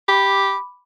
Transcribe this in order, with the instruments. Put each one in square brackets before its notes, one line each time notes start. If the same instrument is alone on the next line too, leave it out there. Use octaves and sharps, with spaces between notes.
[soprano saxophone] G4 [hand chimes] B5 D6